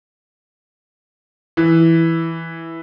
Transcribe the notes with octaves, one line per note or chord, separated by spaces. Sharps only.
E3